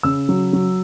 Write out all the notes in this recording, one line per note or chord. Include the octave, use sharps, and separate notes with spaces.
C#3 E6
F#3
F#3